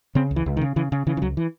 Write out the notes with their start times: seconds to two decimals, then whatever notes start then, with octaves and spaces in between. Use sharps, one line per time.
0.15 C#3 C4
0.31 C#2
0.36 E3
0.46 C#2
0.57 D#3
0.61 C#3
0.76 C#3 E3
0.92 C#3
1.07 C#3 E3
1.17 E3
1.22 C#2 F#3
1.37 E3